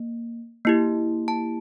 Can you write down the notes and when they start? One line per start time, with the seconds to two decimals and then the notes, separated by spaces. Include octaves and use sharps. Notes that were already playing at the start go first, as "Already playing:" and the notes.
Already playing: A#3
0.65 A#3 E4 G4
1.28 A5